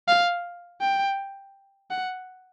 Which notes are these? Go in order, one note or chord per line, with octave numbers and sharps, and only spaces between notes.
F5
G5
F#5